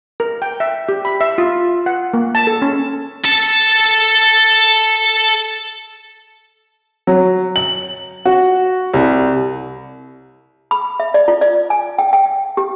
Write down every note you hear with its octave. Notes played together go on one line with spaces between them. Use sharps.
A#4
G5
E5
G4
B5
E5
F4
F#5
A#3
A5
A4
C#4
A4 A5
F#3
F#7
F#4
C2
B5
E5
D5
F4
D5
G#5
G5
G5
G4